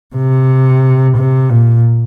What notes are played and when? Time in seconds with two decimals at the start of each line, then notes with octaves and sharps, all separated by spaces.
0.16 C3
1.17 C3
1.49 A#2